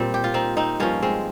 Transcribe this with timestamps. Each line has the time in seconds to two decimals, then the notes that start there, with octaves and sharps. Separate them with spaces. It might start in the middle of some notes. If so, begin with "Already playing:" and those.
Already playing: A#2 G3 C4
0.14 G4
0.24 F4
0.34 C4 D#4
0.57 C4 D#4
0.80 G2 F3 A#3 C#4
1.03 G#3 C4